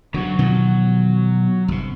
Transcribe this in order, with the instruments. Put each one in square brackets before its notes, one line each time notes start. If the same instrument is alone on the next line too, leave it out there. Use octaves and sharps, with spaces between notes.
[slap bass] G2 D3 [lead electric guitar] F#3 F#4
[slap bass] B2 D#3 F3
G1 C3